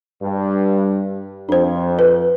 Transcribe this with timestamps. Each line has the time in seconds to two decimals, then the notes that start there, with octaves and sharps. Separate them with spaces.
0.22 G2
1.49 F2 D4 C5
1.99 B4